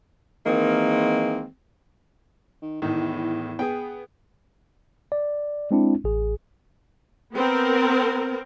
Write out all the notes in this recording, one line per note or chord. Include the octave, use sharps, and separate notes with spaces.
D#3 E3 G#3 A#3 C4
D#3
E2 A2 D#3
B3 G#4 G5
D5
G#3 C4 D4 E4
A1 G#4
B3 C4 A#4